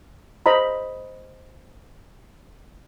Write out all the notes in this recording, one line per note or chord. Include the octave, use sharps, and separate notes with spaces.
C5 D#5 A#5 B5